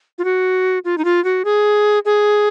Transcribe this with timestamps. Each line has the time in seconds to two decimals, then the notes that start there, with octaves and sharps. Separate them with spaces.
0.19 F4
0.25 F#4
0.85 F4
0.98 D#4
1.05 F4
1.24 F#4
1.45 G#4
2.05 G#4